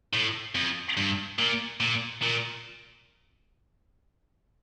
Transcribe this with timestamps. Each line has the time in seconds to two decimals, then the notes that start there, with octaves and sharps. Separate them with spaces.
0.13 A2
0.55 F2
0.97 G2
1.39 A#2
1.80 A#2
2.22 A#2